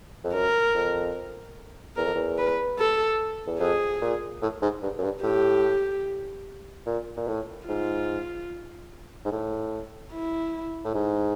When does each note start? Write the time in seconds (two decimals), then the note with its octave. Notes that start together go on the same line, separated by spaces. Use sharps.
0.24 F2
0.34 F#2 A#4
0.74 F2
1.96 E2 A#4
2.05 F2
2.15 E2
2.38 B4
2.79 A4
3.47 E2
3.60 F2 G#4
4.01 A#2
4.42 A2
4.62 G#2
4.82 G2
4.98 F#2
5.04 G2
5.23 A2 G4
6.86 A#2
7.17 A#2
7.27 A2
7.68 G#2 F4
9.25 G#2
9.32 A2
10.13 E4
10.84 A2
10.94 G#2